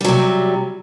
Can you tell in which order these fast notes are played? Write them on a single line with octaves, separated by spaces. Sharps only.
G3 F#3 C3